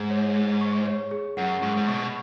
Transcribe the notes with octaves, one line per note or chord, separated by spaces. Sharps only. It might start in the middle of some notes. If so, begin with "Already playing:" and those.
Already playing: G#2 G#4 F#5
C#5
G#4
C#6
C#5
G#4
F#2 F#5
G#2 C#6
G#2
B2 C#6